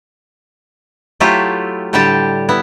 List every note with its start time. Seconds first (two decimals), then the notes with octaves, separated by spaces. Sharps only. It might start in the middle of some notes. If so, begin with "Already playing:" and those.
1.20 F#3 A3 E4 F4 G4
1.93 A2 D3 G3 G4 G5 A5
2.49 B3 E4